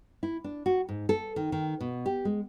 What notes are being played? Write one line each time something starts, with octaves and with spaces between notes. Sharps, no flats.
E4
D4
F#4
G#2
A4
D#3
D#3
B2
G4
G#3